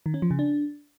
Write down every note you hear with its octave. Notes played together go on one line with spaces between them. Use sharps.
D#3
C#4
F3
C#3
D4